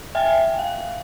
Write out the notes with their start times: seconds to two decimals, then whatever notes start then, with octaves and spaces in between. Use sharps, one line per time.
0.15 E5 G5 G#5
0.59 F5